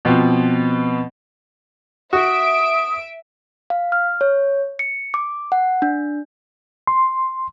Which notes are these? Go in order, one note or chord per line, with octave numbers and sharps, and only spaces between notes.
B2 F3 B3 C4
F#4 E5 D#6 D7
F5
F6
C#5
C#7
D6
F#5
D4
C6